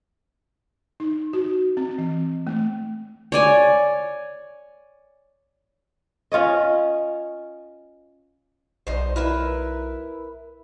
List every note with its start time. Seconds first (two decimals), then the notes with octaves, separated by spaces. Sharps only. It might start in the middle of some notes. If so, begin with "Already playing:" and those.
1.00 D#4
1.33 F#4
1.77 C4
1.98 E3
2.47 A3
3.32 C#5 D5 G#5
6.32 C#4 F4 C#5 D#5
8.87 B1 D#4 C5
9.16 E4 A#4 B4 E5